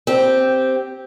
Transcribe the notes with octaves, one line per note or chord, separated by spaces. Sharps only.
C4 G4